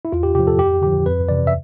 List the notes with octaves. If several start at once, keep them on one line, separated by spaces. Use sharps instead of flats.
E4
E2 F4
G4
C3 F3 G4
A4
F2 G4
D3 F3 G4
F2 B4
C3 E3 D5
E5